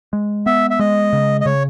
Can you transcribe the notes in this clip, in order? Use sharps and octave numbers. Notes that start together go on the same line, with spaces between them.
G#3
B3 E5
E5
G#3 D#5
C#3
D#5
C#3 C#5